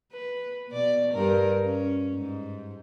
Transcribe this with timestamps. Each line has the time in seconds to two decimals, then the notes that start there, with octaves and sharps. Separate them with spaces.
0.12 B4
0.69 B2 D5
1.13 G2 A#4
1.64 C#4
2.14 G#2